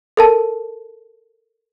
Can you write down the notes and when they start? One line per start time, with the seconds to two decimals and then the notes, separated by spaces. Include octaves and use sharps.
0.17 A4 A#4 A5